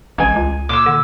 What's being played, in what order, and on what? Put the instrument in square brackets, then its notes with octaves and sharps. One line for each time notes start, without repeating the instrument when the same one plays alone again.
[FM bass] A1 [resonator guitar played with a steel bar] G#3 G#5
[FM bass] C#2
[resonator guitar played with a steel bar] A#2 [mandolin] D6 E6
[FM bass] D3